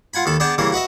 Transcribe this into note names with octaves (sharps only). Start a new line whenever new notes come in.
F4 F#5 G#5 B5
D#2 D#3 A4 B5
B3 D4 G#4 D5 G5 A5
C#3 E3 G3 A#3 A#4
F#4 B4 D#5 E5